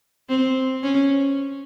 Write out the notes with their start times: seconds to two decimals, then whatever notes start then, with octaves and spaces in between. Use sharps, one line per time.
0.29 C4
0.83 C#4